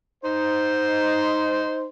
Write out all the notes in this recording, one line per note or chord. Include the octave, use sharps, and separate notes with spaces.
D#4 C5